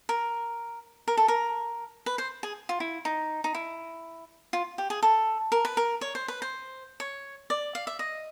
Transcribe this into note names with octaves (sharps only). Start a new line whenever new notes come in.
A#4
A#4
A4
A#4
B4
C5
G#4
F4
E4
D#4
D#4
E4
F4
G4
G#4
A4
A#4
B4
A#4
C#5
C5
B4
C5
C#5
D5
F5
E5
D#5